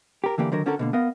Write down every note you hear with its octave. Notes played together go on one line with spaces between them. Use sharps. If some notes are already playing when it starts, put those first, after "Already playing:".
G4 A#4
D3 E3 A#3 G4 D5
D3 D#3 F#3 A#4
D3 C#4 F#4 A4 A#4
B2 D3 A#3
B3 A#4 D#5 F5